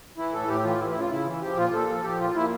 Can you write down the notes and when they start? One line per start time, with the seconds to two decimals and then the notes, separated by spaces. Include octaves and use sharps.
0.18 E3 E4
0.32 A2 A4
0.48 A2 G4
0.64 E3 F4
0.79 E3 E4
0.90 C#3 E4
1.00 F4
1.11 C#3 E4
1.26 E3
1.42 F3 G4
1.57 A#2 F4
1.73 A#2 A4
1.88 F3
2.03 F3 G4
2.20 A#2 F4
2.35 A#2 E4